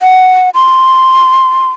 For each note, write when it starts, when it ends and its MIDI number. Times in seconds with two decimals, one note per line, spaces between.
0.01 0.50 78
0.54 1.70 84